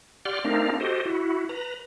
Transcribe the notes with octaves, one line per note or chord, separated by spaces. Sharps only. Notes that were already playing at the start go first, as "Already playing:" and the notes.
G4 D5 F#5 C6 F6
A3 C4 D4 D#4 A#4 F5
F#4 G4 A4 C5 D#5
E4 F#4
B4 A#5